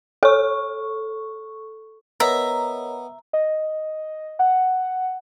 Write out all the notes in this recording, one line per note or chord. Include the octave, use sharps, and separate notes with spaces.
A4 C#5 G#5 C#6
B3 A#4 C#5 D#5 E5 A#5
D#5
F#5